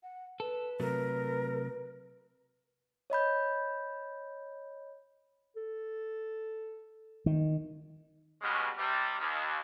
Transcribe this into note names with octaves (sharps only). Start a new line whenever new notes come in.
F#5
A4 B4
C3 F#3 A3 A#4
C#5 D#5 B5 G6
A4
D#3
B2 G3 G#3 B3 C#4
C3 G3
D#2